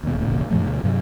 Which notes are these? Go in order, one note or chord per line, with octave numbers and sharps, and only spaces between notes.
D#2 B2
D#1 A2
E1 A1 A#2 C#3
F#2 A#2 F3 A3
D2 B2
G2 C3 F#3